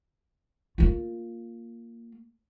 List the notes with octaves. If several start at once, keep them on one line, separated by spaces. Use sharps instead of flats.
A#3 F4